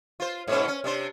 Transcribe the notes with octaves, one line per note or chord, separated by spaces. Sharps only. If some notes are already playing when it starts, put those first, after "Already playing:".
F4 C5
G#2 B2 C#4
C#4
C3 D4 C5